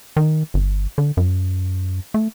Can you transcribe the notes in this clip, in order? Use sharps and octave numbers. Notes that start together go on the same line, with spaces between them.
D#3
G1
D3
F#2
A3